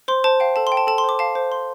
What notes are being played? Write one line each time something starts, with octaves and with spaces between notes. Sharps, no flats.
C5 C6
C5 A5
F5 G5
A4 A5
C6
G5
A5
A4 A5
C6
C5
D6
F5 A5
C5
C5 C6